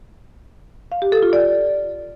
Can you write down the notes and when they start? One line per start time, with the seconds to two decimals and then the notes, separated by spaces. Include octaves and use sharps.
0.92 F5
1.02 G4
1.12 A4
1.23 F4
1.33 D5